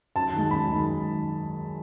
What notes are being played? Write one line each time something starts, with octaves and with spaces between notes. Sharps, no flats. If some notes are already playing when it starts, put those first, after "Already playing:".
F#2 A5
D#3 G#3
F#2 B5
D#3 G#3